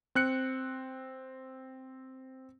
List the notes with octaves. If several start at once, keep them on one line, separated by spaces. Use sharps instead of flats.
C4 F#6 C#7